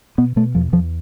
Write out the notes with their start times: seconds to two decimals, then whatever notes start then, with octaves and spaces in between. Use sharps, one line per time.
0.18 B2 B3
0.36 B2 A3
0.55 E2 F3
0.72 E2 F3